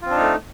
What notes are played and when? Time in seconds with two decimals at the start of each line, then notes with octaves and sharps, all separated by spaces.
0.01 F4
0.06 C4
0.11 D4
0.15 D#4
0.20 A3